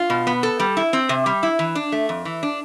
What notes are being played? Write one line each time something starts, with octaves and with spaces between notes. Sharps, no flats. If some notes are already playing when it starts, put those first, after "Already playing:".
Already playing: F4
B2
B3
A4
G3
E4
C4
C3
G3
E4
E3
D4
A3
F2
E3
D4